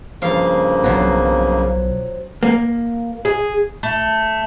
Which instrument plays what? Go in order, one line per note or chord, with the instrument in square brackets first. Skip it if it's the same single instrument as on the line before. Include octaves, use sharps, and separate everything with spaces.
[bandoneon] G2 C#3 A#3 [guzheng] F3 F5
[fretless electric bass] B1 B3 [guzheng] F3 F#3
[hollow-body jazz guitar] A#3
[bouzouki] G#4
A3